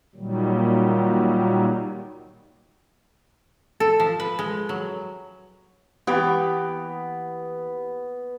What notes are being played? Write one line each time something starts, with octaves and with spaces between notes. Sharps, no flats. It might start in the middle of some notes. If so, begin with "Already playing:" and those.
A#2 D#3 F#3 G3
A4
F3
B4
G#3
F#3
E3 B3 G4